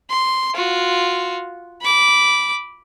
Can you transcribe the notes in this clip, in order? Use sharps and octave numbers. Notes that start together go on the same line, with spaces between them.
C6
F4 F#4
B5 D6